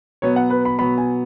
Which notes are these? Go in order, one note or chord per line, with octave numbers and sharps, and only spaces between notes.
B2 F#3 B3 C#5
F#5
B4
B5
B2 F#3 B3 B5
G#5